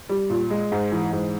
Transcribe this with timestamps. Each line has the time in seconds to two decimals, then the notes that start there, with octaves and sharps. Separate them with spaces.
0.09 G3
0.30 A#2
0.50 G#3
0.72 G#2
0.92 E3
1.13 G#2